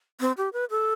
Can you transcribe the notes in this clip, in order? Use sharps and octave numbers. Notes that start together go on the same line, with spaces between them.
C4
G4
B4
A4